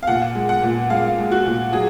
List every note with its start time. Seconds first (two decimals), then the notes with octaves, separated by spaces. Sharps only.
0.03 F5
0.07 A#2 F#5
0.35 G#3
0.49 F#5
0.62 A#2
0.90 G#3 F5
1.18 G#3
1.32 F#4
1.46 A#2
1.73 F#3 G#4